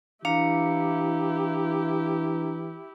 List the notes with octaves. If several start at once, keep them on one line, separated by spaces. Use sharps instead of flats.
E3 D4 E4 G4 F5 A#5 C#7